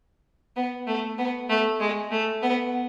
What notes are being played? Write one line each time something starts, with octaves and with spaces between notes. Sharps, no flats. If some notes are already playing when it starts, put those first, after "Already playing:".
B3
A3
B3
A3
G#3
A3
B3